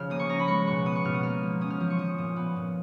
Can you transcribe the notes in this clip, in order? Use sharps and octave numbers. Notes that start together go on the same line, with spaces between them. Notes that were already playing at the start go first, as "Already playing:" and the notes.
Already playing: C#3 F3 F6
A#3 D#6
C#6
C#4 A#5
B5
G#3 C#6
B2 C#6
B3 D#6
C#6
B2 F6
D#6
A#3 F6
F3
C#4 D#6
F6
F3 D#6
C#6
F3 D#6
A#2 D#6
B3
A#2